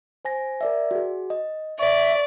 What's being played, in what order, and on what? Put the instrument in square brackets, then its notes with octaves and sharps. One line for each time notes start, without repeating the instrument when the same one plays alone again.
[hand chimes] C5 G#5 A#6
A#4 D5 E5
F#4 G#4
D#5
[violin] D5 [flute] E5 [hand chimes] C#6